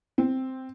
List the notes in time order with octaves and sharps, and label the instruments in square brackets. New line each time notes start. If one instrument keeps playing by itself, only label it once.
[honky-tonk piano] C4